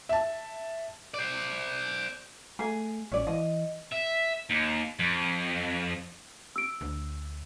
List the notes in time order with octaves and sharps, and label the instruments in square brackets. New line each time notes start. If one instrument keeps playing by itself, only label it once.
[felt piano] E5 A5
[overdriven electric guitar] C5 D5
[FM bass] A3 [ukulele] G#4
[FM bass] A1 [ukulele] C#4 D5
[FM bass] E3 [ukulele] D#5
[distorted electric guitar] E5
D#2
F2
[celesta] E6 D7
[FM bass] D2